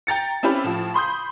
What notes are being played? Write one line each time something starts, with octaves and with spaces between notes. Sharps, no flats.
G5 A#5 A6 C#7
C4 C#4 E4 G4 B4
A2 F3
B5 C6 D#6 G6